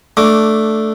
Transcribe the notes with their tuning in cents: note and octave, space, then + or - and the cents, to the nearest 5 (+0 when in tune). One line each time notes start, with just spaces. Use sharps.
A3 +0 D4 +5 D6 -10